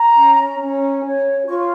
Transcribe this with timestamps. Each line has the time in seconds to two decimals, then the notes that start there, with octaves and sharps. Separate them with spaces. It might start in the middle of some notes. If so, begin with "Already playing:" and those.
Already playing: A#5
0.15 C#4
0.59 C#4
1.03 C#5
1.46 F4 C#6